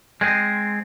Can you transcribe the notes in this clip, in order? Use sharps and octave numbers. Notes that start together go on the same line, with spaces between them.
G#3 C4 G#4